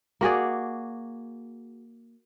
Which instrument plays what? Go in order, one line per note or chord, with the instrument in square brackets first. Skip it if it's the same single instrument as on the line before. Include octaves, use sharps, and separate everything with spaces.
[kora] A#3 F#4 G#4 D5